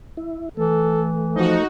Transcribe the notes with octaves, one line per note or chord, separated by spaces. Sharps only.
E4
E3 A3 A4
F3 D#4 F#4